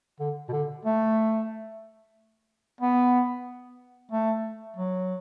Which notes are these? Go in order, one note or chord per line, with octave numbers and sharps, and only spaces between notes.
D3
B2
D3
A3
B3
A3
F#3